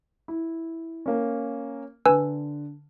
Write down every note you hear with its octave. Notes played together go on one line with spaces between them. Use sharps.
E4
A#3 C#4
D3 B4 G#5 E6